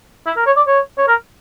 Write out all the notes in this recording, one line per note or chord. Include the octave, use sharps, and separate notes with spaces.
E4
A#4
C#5
D5
C#5
C#5
A#4